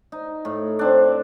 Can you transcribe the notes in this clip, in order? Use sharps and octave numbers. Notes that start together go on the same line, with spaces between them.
D#4
A2
C4 D4